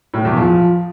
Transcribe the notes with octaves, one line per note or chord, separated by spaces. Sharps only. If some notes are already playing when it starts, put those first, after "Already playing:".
A2
E2
F3